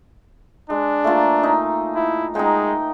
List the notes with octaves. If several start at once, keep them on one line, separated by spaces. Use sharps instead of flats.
G#3 D4
A3 A#3 F4
D#4
E4
G#3 D#4 F#5 G5